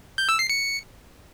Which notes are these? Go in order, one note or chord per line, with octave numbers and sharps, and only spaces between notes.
G6
E6
C7
C#7